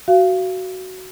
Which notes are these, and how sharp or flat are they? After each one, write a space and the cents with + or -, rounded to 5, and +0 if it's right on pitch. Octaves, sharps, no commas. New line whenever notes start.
F#4 +10 F5 -25